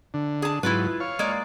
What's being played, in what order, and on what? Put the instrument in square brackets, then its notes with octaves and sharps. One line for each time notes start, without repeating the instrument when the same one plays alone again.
[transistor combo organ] D3
[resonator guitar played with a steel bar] G#4 A5
[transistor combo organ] G#2 F#3 [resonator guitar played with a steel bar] E4 F4 B4
[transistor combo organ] C#5 F5
[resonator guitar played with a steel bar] G#3 A#3 D5